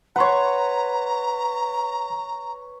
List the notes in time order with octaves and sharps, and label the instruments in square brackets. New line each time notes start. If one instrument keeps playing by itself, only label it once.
[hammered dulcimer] B4 C#5 [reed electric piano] F#5 C6 [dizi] A#5